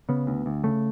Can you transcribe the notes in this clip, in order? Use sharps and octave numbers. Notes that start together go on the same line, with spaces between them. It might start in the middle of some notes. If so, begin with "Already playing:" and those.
C#3 B3
D2
D2
C#3 A3